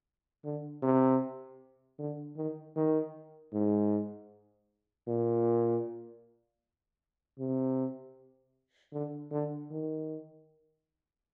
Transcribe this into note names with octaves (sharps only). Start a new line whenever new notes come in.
D3
C3
D3
D#3
D#3
G#2
A#2
C3
D3
D3
D#3